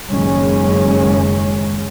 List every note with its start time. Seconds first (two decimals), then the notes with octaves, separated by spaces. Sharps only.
0.11 F#1 F#2 D#3 G#3 C#4